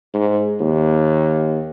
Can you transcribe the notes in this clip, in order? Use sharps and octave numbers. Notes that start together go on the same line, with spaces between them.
G#2
D#2